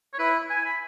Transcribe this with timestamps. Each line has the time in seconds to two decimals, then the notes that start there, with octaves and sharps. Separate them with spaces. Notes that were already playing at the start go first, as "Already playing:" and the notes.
0.13 C#5
0.19 E4 B4
0.50 G#5
0.65 B5